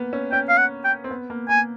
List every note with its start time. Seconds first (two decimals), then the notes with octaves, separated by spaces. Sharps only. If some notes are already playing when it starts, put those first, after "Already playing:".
Already playing: A#3 B3
0.13 C#4
0.32 C#4 G5
0.49 F5
0.58 F#5
0.84 G5
1.04 C4
1.11 B3
1.30 A#3
1.49 A#3 G#5